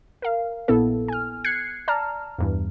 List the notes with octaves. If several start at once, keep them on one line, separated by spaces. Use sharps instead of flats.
A#4 F5
A#1 A#2 B3 E4 A4
G#5 F6
F#6 G#6 C7 C#7
D5 A5 A#5 F6
E2 G2 E3